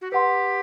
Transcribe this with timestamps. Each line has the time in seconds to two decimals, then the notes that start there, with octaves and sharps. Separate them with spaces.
0.01 F#4
0.11 G4 B4 F#5 C6